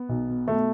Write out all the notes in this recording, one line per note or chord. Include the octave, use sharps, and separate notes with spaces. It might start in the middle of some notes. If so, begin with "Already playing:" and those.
Already playing: B3
B1
B2
B2 A3